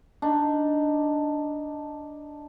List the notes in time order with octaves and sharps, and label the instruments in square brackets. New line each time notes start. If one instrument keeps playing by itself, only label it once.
[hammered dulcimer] D4 D#4